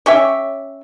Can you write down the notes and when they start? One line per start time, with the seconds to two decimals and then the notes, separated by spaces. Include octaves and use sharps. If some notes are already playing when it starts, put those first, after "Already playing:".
0.06 C#4 G4 C#5 E5